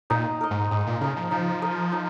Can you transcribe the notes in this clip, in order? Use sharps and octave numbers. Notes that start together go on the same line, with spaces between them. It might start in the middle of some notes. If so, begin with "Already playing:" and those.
A#2 D#4
A#4 D#5
G#2
G#2 D#4
A#2
C#3 A#4 D#5
F3
F3 D#4
A#4 D#5
D#4